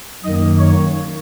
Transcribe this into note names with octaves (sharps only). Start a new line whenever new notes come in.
F#2 D#3 A#3 D#5
C#5